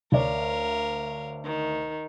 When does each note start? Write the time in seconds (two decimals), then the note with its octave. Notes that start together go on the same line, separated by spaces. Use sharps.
0.12 D2 A#4 C#5 D5 F5
1.45 D#3